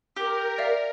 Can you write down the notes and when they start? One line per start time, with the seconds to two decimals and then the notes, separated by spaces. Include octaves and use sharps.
0.16 G4 A#4
0.58 D5 E5 F5